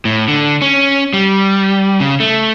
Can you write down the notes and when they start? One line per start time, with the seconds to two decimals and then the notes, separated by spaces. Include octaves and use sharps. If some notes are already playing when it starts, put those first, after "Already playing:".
0.05 A2
0.28 D3
0.62 C#4
1.13 G3
2.00 C#3
2.20 A3